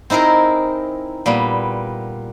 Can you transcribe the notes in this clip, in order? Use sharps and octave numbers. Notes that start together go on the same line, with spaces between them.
C4 D#4 E4 G#4 A#4
A#2 G3 B3